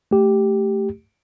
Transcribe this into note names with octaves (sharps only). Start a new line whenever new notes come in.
A3 G4